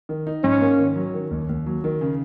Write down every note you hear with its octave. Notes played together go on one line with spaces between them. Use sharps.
D#3
D#4
G#2 C#4
A#3
D#3
F#3
D#3
D#2
D#2
F#3
D#3
C#3